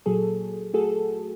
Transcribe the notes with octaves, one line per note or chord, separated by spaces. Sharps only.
A#2 F#3 G#4 A4
A3 F#4 G#4 A4